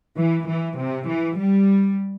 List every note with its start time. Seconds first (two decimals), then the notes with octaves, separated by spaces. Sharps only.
0.17 E3
0.47 E3
0.79 C3
1.08 E3
1.39 G3